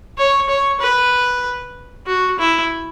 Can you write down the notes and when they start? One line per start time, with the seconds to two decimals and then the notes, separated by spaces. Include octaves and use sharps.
0.18 C#5
0.49 C#5
0.80 B4
2.07 F#4
2.39 E4